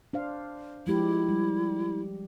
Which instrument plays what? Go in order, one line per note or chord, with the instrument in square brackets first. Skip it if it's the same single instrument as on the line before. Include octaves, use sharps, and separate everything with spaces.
[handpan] D4 C5 F5
[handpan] F3 G#3 G4 [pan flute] E4
[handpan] G3